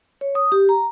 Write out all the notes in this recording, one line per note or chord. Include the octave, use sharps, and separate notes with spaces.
C#5
D#6
G4
A#5